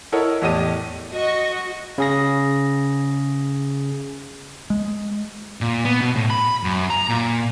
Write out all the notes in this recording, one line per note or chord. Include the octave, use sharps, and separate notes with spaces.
E4 A4 A#4 C#5 D#5 F#5
E2 A2 G4 D#5 A5 D#7
F#4 D#5 C#6
C#3 G#4 A#6
G#3
A#2
B3
B2
A2
B5
F#2
A#5
A#2